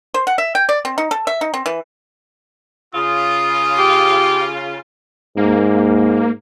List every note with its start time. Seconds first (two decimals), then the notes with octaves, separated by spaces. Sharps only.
0.14 C5
0.27 F#5
0.38 E5
0.55 G5
0.69 D5
0.85 C4
0.98 D#4
1.11 A4
1.27 E5
1.41 D#4
1.54 C4
1.66 E3
2.95 C#3 F4 D#6
3.78 G4
5.37 G#2 A#3